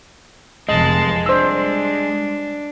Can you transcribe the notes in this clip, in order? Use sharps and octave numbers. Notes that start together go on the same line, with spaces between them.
F1 F3 G#3 D#5 A5
G3 D4 C5 E6